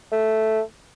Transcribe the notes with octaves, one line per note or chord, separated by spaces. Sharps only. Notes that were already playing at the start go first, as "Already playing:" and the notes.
A3